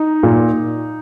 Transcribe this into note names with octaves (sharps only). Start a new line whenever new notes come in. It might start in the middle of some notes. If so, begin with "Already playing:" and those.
Already playing: D#4
A#2